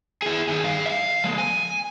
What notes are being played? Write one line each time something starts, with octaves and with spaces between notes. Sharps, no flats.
E4 G#4
D#3 G#4
G2 F5
E5 F5
F3 G#3
G#5